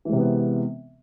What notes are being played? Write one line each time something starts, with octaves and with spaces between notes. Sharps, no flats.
C3 E3 G#3 B3 C4